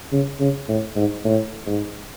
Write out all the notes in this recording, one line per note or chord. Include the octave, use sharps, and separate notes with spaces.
C#3
C#3
A2
G#2
A2
G#2